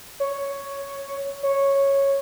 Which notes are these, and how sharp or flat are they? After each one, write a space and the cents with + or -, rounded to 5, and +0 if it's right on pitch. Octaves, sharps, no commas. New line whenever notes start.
C#5 +5
C#5 -5